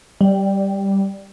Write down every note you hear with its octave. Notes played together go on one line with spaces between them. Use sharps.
G3